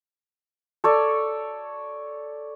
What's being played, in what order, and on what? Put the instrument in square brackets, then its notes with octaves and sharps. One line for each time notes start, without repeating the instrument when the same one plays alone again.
[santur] A4 C#5 D5